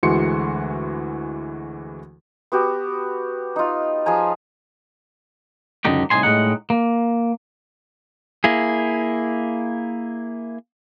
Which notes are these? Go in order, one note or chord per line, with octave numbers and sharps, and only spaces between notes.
D2 E3 G#3 F#4 C6 C#7
B3 F#4 G4
D#4 F4
F3 G#4 G#5 A#5
C#2 F#2 D3 D#4 G4
C2 A2 D#4 G#5 C6
A2 G3 G#3 D#4 F#5
A#3
A#3 E4 G#4